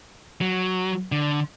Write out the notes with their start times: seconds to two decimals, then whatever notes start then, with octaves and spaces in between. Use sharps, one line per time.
0.41 F#3
1.12 D3